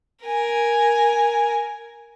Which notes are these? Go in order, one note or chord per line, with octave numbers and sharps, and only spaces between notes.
A#4 G#5